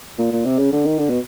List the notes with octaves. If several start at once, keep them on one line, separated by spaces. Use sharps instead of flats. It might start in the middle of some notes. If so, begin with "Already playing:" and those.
A#2
A#2
C3
C#3
D3
D#3
D3
B2